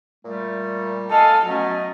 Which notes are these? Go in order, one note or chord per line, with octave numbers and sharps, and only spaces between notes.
A#2 G3 A3
A4 D#5 F5 G#5
B2 F#3 A3 C#4 D#5